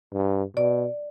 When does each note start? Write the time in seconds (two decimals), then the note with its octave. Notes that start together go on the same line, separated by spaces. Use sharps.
0.13 G2
0.56 B2 D5